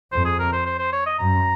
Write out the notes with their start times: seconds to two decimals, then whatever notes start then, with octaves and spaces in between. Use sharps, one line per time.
0.12 F2 C5
0.25 G#4
0.39 A#4
0.53 C5
0.66 C5
0.79 C5
0.93 C#5
1.06 D#5
1.19 F#2 A#5